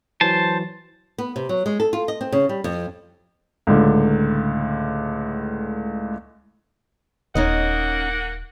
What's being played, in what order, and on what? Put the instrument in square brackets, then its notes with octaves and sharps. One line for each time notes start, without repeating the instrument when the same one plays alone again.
[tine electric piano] E3 F#3 [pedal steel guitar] C5 A5
[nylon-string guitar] B3
C3
F#3
G#3
A4
F4
D#5
C4
C#3
G3
F2
[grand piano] C#2 A2 D3
[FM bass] D#1 [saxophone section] A#3 F#5 [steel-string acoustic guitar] C#4 D#4 D#5